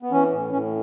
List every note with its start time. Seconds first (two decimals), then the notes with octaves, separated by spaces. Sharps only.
0.02 B3
0.11 E3 C#4
0.33 A2
0.52 A2 C#4